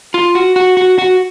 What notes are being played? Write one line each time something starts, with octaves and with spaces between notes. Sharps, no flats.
F4
F#4
F#4
F#4
F#4